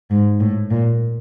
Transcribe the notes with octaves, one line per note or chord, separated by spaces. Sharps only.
G#2
A2
A#2